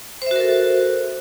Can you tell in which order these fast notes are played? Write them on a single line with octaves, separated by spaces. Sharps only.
C5 E5 F#4 A#4 A4